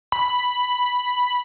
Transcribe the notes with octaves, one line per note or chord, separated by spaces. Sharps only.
B5